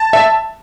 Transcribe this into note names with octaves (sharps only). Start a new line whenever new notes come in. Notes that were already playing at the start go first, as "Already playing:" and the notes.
Already playing: A5
E5